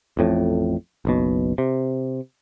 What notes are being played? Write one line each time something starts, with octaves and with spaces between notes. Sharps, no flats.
A1 F2 A2
F#1 B1 B2
C3